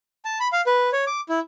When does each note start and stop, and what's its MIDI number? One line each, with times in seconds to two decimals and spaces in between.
0.25 0.39 81
0.40 0.48 83
0.52 0.61 77
0.66 0.90 71
0.93 1.04 73
1.07 1.21 86
1.29 1.40 64